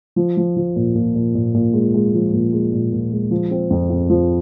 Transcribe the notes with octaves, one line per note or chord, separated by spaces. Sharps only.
F3
F3
F3
A#2
A#2
A#2
A#2
A#2
G#3
G#3
F3
A#2
G#3
A#2
A#2
G#3
F3
C4
F2
F2
F3